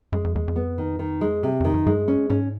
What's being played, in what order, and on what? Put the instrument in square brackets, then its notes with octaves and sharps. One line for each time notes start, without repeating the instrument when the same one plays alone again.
[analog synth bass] F#2 [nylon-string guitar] G#3
[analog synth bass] F2
[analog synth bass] E2 [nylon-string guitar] G#3
[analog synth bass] F2
[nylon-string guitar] B3
D#3
D#3
G#3
C3
[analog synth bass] F2 [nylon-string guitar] D#3
[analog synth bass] F#2
[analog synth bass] G2 [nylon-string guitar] G#3
[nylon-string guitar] C#4
[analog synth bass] G#2 [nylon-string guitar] C#4